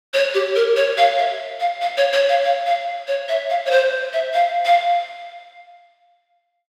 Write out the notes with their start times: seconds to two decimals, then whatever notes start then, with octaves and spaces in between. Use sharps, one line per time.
0.14 C#5
0.34 G4
0.56 A#4
0.76 C#5
0.98 F5
1.18 E5
1.60 F5
1.81 F5
1.97 C#5
2.13 C#5
2.29 F5
2.45 F5
2.66 F5
3.08 C#5
3.29 E5
3.50 F5
3.65 C#5
3.71 C5
4.13 E5
4.34 F5
4.65 F5